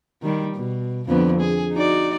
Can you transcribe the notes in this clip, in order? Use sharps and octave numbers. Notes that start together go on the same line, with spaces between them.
D#3 G3
B2
F2 D3 B3
G#4
D#4 F#4 D5